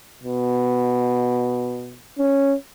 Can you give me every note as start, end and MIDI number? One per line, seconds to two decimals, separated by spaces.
0.24 1.98 47
2.19 2.54 61